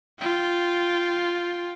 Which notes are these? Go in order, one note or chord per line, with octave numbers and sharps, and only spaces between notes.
F4 G5